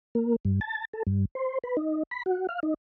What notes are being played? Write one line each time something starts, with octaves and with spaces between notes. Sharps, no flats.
A#3
G2
A5
A4
G2
C5
B4
D#4
B5
F#4
F5
D#4